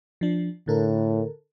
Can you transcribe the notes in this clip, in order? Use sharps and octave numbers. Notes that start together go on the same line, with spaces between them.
F3 D4
A2 D3 A4 A#4